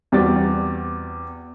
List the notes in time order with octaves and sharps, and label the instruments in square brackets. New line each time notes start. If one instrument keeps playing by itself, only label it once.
[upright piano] E2 G3 C4 F#4 D5 A6